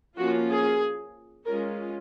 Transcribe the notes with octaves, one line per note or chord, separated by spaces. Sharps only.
F3 A#3 C#4 F4 F#4
G#4
G#3 C#4 F4 A#4